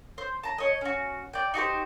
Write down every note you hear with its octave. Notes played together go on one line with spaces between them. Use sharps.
C5
A5 A#5
C#5 D#5
C#4 F#4
D5 G5
D#4 F#4 G4 C5